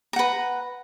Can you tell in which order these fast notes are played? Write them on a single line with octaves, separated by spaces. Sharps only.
A#5 F#5 B4